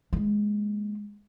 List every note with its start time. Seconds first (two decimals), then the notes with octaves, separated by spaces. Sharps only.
0.13 G#3 A#3